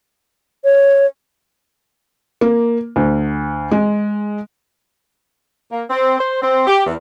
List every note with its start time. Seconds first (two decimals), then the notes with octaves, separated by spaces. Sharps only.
0.64 C#5
2.41 A#3
2.96 D2
3.71 G#3
5.72 A#3
5.90 C4
6.18 C5
6.42 C4
6.67 G4
6.86 E2